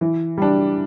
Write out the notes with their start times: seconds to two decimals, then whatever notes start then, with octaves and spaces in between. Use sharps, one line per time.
0.01 E3
0.37 G3 D4